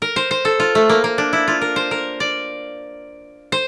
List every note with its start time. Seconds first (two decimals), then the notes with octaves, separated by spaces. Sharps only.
0.02 A#4
0.16 C5
0.31 C5
0.45 A4
0.60 F4
0.75 A3
0.89 A#3
1.04 A#3
1.18 D4
1.33 E4
1.48 F4
1.62 A#4
1.76 C5
1.91 A#4
2.20 D5
3.52 C5